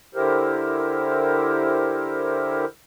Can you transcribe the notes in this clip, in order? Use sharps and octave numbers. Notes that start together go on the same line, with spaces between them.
D3 E4 G4 A#4 C5